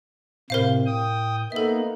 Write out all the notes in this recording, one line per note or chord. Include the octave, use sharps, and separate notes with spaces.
A2 C3 A#4 C5 F5
G5 D#6
A#3 B3 D#4 A4 E5